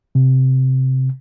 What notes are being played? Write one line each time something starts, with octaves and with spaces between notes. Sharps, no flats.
C3